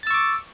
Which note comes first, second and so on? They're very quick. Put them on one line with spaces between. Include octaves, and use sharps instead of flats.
A6 E6 C#6 D6